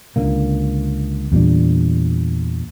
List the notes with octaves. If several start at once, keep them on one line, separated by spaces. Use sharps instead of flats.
C#2 D3 A#3
E2 A#2 G3 D4